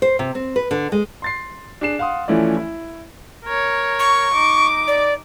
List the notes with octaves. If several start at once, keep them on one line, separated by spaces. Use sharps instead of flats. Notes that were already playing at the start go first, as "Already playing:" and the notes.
C5
C3
C4
B4
D3
G#3
C6 A6 C7
D4 G#4 C7 E7
F5 F#5 C6 D#6
E3 F3 A3 C#4 E4 D5
E4
A#4 C#5
C#6
D#4 D6
D5